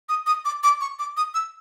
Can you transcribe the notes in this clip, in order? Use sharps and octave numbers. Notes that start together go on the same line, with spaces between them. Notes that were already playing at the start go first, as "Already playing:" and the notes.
D#6
D#6
D6
D6
C#6
D6
D#6
E6